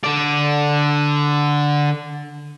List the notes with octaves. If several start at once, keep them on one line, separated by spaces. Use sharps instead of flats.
D3 D5